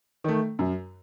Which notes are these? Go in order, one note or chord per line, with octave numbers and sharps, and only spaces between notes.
D#3 A3
F#2